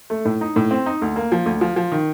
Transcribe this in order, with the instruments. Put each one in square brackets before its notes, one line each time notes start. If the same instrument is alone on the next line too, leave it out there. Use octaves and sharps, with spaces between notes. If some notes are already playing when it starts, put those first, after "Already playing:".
[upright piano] A3
A2
D#4
A2
C4
D#4
D2
A#3
F3
D2
F3
F3
D#3